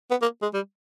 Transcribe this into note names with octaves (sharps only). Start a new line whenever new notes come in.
B3
A#3
G#3
G3